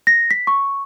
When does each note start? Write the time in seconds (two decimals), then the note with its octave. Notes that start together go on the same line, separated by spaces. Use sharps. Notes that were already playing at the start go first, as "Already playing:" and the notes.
0.07 A#6
0.31 B6
0.47 C#6